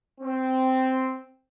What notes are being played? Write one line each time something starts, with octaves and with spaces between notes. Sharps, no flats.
C4